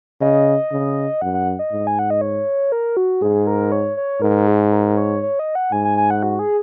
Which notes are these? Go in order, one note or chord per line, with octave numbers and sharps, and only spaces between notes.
C#3 D#5
C#3
F#2 F#5
F#5
D#5
G#2
G#5
F#5
D#5
C#5
A#4
F#4
G#2 G#4
A#4
C#5
C#5
G#2 A#4
G#4
A#4
C#5
C#5
D#5
F#5
G#2 G#5
G#5
G#5
F#5
F#4
G#4